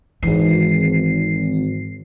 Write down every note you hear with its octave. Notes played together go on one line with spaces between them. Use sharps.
G#1 E3 C7